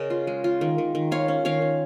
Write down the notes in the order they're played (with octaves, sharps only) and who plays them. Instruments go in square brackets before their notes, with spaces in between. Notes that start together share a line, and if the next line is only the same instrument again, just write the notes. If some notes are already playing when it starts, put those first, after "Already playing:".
Already playing: [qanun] C#3 C#4 A#4 D#5
F4
G#3
F4
D#3
D#3
D#3
F4 C#5 F5
C#4
D#3 C#5 F5
D#3